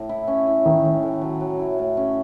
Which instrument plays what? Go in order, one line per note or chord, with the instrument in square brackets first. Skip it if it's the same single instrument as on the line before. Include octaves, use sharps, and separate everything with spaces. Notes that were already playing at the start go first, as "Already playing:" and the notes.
Already playing: [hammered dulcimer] A2
E4
C#4
E4
[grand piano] D#3 [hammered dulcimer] E4
[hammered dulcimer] A2
A2
F#3
F#3
E4
A2
C#4